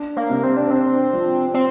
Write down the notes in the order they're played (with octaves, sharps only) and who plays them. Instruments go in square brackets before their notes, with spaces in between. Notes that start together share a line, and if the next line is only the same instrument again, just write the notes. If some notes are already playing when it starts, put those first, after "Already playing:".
Already playing: [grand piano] D4
[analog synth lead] A#3
[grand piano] C3
[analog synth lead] C4
D4
[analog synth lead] C4 [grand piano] D4
[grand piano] F3
[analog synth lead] C4